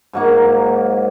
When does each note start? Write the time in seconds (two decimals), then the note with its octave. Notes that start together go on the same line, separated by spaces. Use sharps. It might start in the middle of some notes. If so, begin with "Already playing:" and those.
0.13 G#2 F#3 A#3 D#4